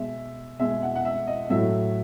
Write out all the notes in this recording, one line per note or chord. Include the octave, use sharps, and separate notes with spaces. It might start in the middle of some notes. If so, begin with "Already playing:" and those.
Already playing: B2 G#3 E5
B2 G#3 E5
F#5
F#5
E5
D#5
A2 F#3 A3 E5